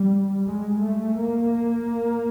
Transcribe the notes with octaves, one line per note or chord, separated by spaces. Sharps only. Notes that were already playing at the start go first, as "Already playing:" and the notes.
Already playing: G3
G#3
A3
A#3